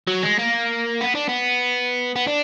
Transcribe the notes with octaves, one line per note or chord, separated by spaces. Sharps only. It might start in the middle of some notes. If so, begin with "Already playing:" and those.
F#3
G#3
A#3
B3
D4
B3
B3
D4